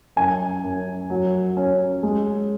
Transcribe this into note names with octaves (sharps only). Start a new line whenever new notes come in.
F#2 G#5
F#2
F#3
C#4
G#3